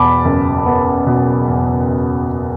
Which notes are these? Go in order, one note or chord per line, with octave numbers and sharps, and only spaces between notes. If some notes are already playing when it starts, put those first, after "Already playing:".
Already playing: E2 B2 A5 B5 D6
F#1
B3
B2
E2